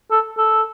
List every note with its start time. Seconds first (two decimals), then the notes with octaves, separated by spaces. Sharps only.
0.11 A4
0.38 A4